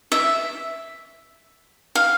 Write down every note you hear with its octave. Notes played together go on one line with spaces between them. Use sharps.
E5
F5